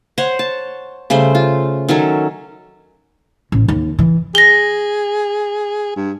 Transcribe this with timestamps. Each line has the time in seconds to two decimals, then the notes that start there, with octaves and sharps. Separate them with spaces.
0.18 C5 C#5 F#5
0.39 A5
1.10 C#3 G3 A3 C5
1.35 F4
1.89 D#3 F#3 C#4 A4
3.52 A1
3.68 D#2
3.99 E3
4.35 G#4 A#6 G7
5.96 G2